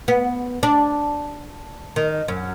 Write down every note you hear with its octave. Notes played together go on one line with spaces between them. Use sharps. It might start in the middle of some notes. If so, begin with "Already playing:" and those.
B3
D4
D#3
F#2